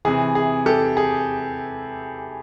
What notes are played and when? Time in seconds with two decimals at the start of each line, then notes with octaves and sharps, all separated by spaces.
0.05 C3 E3 G#4
0.35 G#4
0.66 G4 A4
0.97 G#4